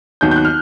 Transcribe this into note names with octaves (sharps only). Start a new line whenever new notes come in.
D#2 D#3 F#3 B3 G6
G6
F#6
F6